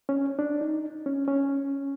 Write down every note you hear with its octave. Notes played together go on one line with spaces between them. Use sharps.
C#4
D4
D#4
C#4
C#4